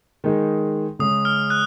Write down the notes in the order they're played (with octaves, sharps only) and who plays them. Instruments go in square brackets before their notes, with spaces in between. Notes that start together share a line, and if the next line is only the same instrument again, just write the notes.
[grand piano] D#3 G#3 D#4 G#4
[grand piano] C#3 G#3 C#4 [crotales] D#6
[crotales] F6
F#6